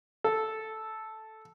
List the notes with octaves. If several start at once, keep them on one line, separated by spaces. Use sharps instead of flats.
A4